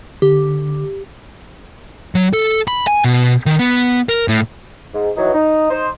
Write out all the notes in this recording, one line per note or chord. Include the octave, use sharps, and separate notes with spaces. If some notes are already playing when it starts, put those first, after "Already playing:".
D3 G4
F#3
A4
B5
G#5
B2
D#3
B3
A#4
A2
G#2
E3 F#3 D#4
D#4
D#4 C5